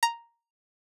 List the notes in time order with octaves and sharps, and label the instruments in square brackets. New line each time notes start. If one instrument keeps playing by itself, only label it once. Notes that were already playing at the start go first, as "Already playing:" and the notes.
[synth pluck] A#5